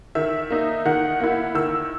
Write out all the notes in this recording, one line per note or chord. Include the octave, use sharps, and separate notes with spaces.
D#3 E5
A#3 D#4
D#3 F#5
A#3 E4
D#3 E6